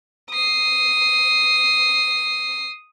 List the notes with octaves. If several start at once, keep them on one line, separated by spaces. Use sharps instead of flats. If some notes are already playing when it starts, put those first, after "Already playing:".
D#6 C7